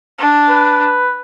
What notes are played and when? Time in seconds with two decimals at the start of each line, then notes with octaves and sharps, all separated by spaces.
0.18 D4
0.49 B4